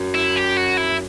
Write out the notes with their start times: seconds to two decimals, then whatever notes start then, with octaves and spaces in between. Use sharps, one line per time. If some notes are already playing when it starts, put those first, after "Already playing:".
Already playing: F#2
0.15 E4
0.37 G4
0.57 F#4
0.77 E4